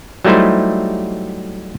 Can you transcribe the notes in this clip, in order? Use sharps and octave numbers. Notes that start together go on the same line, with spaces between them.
F#3 G3 A3 D#4 E4 C5